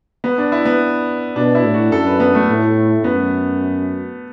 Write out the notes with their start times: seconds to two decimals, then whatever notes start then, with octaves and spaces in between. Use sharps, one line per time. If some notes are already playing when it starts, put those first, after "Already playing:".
0.24 B3
0.38 D4
0.52 E4
0.65 B3
1.36 B2 D4
1.55 E4
1.64 A2
1.74 F#4
1.92 F#2 A4
2.06 B4
2.20 B3
2.35 A3
2.48 A2
3.04 F#2 B3